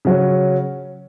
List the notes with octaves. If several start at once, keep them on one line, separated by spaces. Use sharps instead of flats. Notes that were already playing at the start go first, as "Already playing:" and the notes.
C#3 F#3 C#4